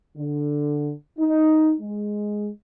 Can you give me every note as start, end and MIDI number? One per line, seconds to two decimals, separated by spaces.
0.17 0.92 50
1.18 1.74 63
1.81 2.49 56